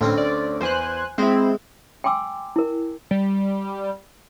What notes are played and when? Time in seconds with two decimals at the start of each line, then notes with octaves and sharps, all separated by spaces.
0.01 D2 A2 C4 C#4
0.18 D5
0.61 E2 C5 G#5 F#6
1.18 G#3 C4 E4
2.04 G5 G#5 C6 D6 E6
2.56 E4 A#4
3.11 G3